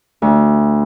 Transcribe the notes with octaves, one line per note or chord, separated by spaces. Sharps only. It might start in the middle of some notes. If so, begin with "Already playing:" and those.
D2